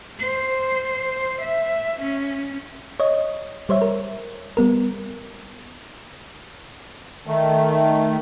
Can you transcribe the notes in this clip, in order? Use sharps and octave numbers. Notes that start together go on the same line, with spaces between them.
C5
E5
C#4
C#5 D#5
G3 C5 C#5 E5
A#4
G3 B3 A#4
D#3 A3